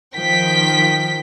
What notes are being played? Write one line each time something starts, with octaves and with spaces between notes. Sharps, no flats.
D#3 F3 G5 B6